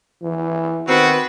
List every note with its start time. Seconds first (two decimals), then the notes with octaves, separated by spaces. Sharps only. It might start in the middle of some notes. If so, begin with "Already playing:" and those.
0.22 E3
0.88 D#3 B3 C4 F#4 B4